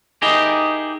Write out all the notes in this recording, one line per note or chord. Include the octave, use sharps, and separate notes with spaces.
D#4 E4 G4 G#4 A#4